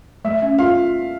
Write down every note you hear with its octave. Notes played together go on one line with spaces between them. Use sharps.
A3 E5
C#4
F4 F5